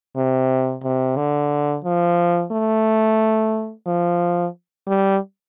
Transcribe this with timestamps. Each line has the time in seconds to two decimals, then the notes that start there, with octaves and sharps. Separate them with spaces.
0.16 C3
0.84 C3
1.17 D3
1.84 F3
2.52 A3
3.86 F3
4.87 G3